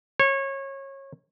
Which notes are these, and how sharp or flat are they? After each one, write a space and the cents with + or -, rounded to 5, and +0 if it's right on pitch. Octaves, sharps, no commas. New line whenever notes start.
C#5 -25